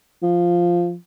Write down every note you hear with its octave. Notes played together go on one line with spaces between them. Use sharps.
F3